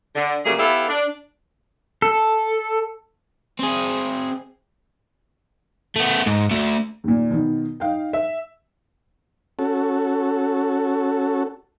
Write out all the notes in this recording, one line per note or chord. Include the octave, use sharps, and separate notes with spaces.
D3
C#3 F#3 G3 A3 A#3 G#4
B3 E4 G4 A4 E5 F5
D4
A4
C4 G#4
A3 B3
G#2
D2 A3
D#2 A#2
B2 D#3
D#4 F5 G5
E5
C#4 F#4 A4